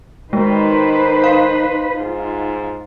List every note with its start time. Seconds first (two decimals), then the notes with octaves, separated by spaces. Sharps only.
0.33 D#3 G#3 D#4 B4 C5
1.24 F5
1.98 G#2 F4